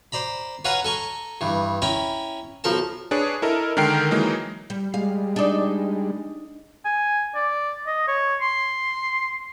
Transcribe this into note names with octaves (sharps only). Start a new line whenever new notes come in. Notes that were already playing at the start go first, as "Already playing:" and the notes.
C5 D5 A#5 B5
B4 C#5 F5 F#5 G#5 A#5
A4 G#5 A#5 C#6
G2 E3
C#4 E4 G5 A#5 B5
B1 F3 A4 A#4 A5
D4 G#4 B4 C#5
E4 A4 A#4 D#5
D3 D#3 G#3 A#4 G5 C7
E3 F#3 G#3 A#3 D#4
G3
G3 G#3 F5
D4 D#4
G#5
D5
D#5
C#5
C6